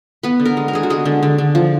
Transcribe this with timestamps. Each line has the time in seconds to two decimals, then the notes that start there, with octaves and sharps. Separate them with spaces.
0.23 B3 B4
0.40 D3
0.46 A#4
0.57 G#3
0.68 A#4
0.73 D3 G#4
0.83 F#4
0.90 G#3 G#4
1.05 D3
1.23 D3
1.38 D3
1.55 F3